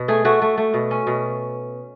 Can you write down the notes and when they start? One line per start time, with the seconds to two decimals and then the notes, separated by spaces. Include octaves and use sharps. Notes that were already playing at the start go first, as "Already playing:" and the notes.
Already playing: B2
0.08 A3 G#4
0.25 A3 F#4
0.42 A3
0.57 A3
0.74 B2
0.91 C#4
1.07 B2